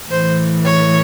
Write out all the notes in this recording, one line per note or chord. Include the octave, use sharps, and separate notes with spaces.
A2 E3 C5
C#5